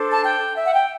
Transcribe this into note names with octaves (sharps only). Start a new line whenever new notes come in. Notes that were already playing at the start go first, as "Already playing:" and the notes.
Already playing: D4 A4 C5
A5
G5
E5
F#5
G5